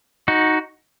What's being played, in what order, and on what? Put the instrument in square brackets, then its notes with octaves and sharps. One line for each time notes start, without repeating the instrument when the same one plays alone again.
[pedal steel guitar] D#4 F#4